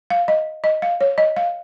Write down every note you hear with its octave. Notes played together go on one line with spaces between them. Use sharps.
F5
D#5
D#5
F5
C#5
D#5
F5